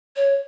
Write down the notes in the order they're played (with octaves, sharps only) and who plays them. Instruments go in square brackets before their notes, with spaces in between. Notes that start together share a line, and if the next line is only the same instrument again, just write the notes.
[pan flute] C#5